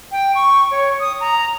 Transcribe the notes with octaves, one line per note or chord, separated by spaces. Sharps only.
G5
C#6
C#5
D#6
A#5